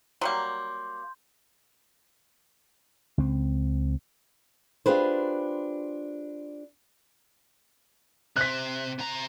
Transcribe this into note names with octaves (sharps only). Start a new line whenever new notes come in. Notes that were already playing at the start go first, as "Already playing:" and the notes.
F#3 G3 A#3 C6 G6
C#2 C4
D4 F4 G4 G#4 B4 C5
C3 F#6 B6
C3 A#5